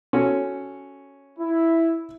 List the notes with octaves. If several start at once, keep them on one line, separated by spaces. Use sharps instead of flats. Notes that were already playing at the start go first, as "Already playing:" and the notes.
C#4 F#4 A4
E4